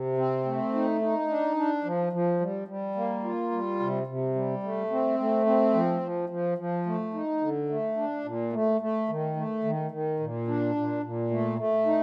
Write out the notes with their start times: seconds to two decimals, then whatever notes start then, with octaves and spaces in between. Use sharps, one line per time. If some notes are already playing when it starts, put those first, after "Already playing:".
Already playing: C3
0.17 C4
0.45 A3
0.74 D#4
1.01 D#4
1.29 D4
1.57 D4
1.84 F3
2.13 F3
2.40 G3
2.68 G3
2.96 A#3
3.24 F4
3.52 G3
3.80 C3
4.07 C3
4.35 G3
4.63 A3
4.91 C4
5.19 A3
5.46 C4
5.74 F3
6.02 F3
6.29 F3
6.58 F3
6.86 A3
7.14 D#4
7.41 D3
7.69 A3
7.97 D4
8.25 A#2
8.53 A3
8.81 A3
9.09 D#3
9.36 A3
9.64 D#3
9.91 D#3
10.20 A#2
10.47 D4
10.75 A#2
11.03 A#2
11.30 A3
11.59 A3
11.86 D#4